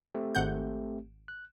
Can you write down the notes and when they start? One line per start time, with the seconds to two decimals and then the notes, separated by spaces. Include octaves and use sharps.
0.14 A3 C4 G4
0.35 G#1 F#5 G6
1.28 F#6